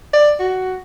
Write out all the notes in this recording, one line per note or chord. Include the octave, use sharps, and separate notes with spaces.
D5
F#4